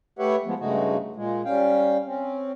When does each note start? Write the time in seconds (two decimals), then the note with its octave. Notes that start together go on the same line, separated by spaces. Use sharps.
0.19 A3 G4 B4 C#5 E5 F#5
0.46 F3 G#3 B3
0.59 G2 C#3 G#3 A3 D#4 F#4
1.16 A#2 G#3
1.45 G3 C#4 F5 G5
2.06 C4 C#4